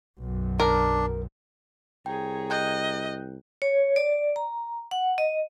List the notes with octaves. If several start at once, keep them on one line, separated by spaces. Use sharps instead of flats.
B1 F#2
D4 A#4
C2 G#4 C#5 G5 A#5
D#5 G5 F#6 G6
C#5
D5
A#5
F#5
D#5